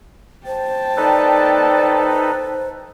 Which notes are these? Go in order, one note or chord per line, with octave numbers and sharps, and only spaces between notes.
C5 G5 A5
D#4 A4 B4 D5